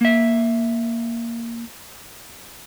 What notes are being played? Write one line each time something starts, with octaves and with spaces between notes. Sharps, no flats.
A#3 E5